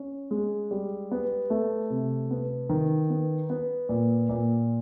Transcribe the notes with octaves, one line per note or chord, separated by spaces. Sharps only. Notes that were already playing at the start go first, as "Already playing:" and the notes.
Already playing: C#4
G#3
G3
B3
A3
C3
B3
D#3
B3
B3
A#2
A#2